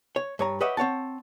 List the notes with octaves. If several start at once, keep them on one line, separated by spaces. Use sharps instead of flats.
C#5
G2 C#5 A#5
G4 B4 C#5 D#5 E5 F#5
C4 C#5 F#5 A5